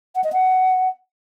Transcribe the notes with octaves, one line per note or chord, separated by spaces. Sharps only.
F#5
D#5
F#5